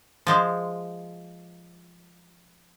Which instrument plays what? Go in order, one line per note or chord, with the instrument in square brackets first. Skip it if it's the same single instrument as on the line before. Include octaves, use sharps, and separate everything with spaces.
[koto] F3 G#3 C5